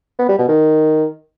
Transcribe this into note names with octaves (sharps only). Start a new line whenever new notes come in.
B3
G3
B2
D#3